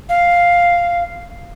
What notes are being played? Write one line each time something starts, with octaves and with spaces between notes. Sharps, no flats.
F5